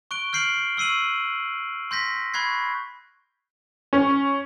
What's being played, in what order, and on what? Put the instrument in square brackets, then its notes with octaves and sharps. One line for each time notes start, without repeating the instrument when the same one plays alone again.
[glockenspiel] C#6 F#6 D7 G7
F6 G6 C7 D7 F#7
C#6 E6 C7 D#7 F#7
C6 G6 A#6 B6
B5 C#6 F#6 G#6 C7
[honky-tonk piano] C#4